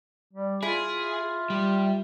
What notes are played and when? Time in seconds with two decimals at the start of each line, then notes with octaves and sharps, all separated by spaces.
0.33 G3
0.63 E4 F4 G#4
1.50 G3